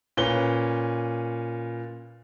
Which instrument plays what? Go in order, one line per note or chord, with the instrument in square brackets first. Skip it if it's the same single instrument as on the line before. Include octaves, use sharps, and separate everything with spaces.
[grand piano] A#2 C#4 B4 G7